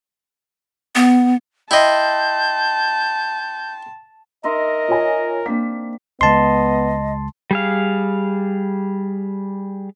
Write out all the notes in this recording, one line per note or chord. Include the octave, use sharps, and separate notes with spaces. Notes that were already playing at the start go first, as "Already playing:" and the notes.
B3
E4 D#5 G5 A5 C6 G6 C7
D#4 A#4 D#5 E5 C6
F4 C#5 G#5
A#3 C4 D4 B6
C#2 C#3 G#3 B3 D#5 A5 C6
G3 G#4 F5